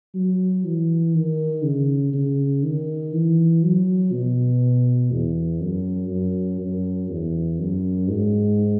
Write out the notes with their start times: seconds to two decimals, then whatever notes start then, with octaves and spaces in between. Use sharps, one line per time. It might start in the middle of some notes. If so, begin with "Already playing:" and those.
0.15 F#3
0.65 E3
1.15 D#3
1.64 C#3
2.14 C#3
2.63 D#3
3.13 E3
3.63 F#3
4.12 B2
5.12 E2
5.61 F#2
6.10 F#2
6.60 F#2
7.10 E2
7.59 F#2
8.09 G#2